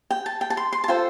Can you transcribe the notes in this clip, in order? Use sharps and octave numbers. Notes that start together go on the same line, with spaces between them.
G5
A5
G5
A5
C6
C6
A5
F4 A4 C5 G5